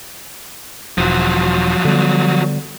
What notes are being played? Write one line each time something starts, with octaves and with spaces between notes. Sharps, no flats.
E1 F3 F#3
D3 G3 B3